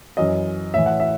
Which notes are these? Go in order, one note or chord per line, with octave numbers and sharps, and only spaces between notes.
F#2 E3 D#5
A2 E3 E5
F#5
E5